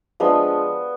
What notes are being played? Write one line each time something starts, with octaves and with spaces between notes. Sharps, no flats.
F3 G#3 B3 D4